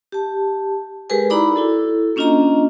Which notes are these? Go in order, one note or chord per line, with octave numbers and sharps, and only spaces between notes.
G4 A5
G#3 G4 G#4 A#4 B4 G#5
D#4 E4 D5 A#5 B5 D6
E4 F#4 A4
A#3 C#4 D4 F4 D#5 A#5